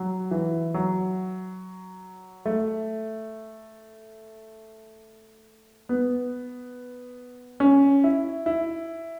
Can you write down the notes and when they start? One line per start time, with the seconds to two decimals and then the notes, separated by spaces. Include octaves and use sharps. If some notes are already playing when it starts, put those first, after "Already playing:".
Already playing: F#3
0.31 E3
0.74 F#3
2.46 A3
5.89 B3
7.60 C#4
8.04 E4
8.46 E4